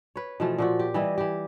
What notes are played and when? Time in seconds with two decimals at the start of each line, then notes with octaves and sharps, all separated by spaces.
0.16 B4 C#5
0.40 B2 E3 F3 A3
0.58 A#2 F3 F#4
0.79 G4
0.94 E3 G3 E4 D#5
1.18 E3 G4